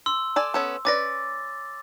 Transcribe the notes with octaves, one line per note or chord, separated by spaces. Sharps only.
C6 E6
A4 D5 G#5
B3 C#4 A4
C#4 B4 D5 D6 A6 A#6